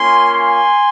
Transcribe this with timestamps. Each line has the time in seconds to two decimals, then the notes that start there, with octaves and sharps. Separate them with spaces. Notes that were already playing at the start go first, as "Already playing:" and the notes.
Already playing: A#3 C#4 F4 G#5 C6
0.32 G#5 C6